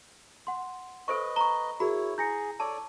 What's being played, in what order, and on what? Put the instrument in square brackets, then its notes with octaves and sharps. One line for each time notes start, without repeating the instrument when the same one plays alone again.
[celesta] F#5 C6
[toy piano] A4 C5 C#6 [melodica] B4 D#5
[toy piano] A#5 C#6 [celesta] G7
[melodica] E4 C#5 [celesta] F#4 G#4 A#4 [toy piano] B5
[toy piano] E4 [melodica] G#4 [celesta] G6 A#6 C#7
[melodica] A4 C#5 D5 [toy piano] A5